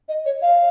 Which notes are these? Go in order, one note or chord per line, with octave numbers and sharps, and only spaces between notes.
D#5
C#5
F5